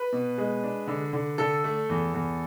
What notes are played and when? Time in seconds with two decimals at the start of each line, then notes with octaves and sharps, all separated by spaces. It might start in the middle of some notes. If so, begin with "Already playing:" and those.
Already playing: B4
0.13 B2
0.38 G#3
0.63 D4
0.87 D3
1.13 D3
1.38 D3 A4
1.64 A3
1.89 E2
2.14 E2